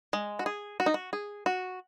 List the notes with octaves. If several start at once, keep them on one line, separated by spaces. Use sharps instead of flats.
G#3
F#4
G#4
F#4
D#4
F#4
G#4
F#4